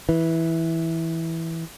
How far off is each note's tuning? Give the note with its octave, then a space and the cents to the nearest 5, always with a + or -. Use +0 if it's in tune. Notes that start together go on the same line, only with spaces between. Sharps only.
E3 -10